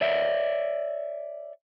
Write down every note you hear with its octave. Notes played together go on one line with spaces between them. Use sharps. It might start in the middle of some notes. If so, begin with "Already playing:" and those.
C#5 D5 E5